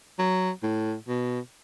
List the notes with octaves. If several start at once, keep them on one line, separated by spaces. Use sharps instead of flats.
F#3
A2
B2